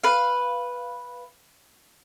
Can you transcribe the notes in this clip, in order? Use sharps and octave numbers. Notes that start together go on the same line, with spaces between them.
B4 F5